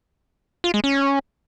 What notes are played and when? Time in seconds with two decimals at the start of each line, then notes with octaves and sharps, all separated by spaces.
0.64 F4
0.74 G#3
0.84 C#4